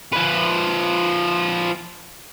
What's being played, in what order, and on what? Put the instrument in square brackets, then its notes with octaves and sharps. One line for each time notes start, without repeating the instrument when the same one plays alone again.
[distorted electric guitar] F3 B4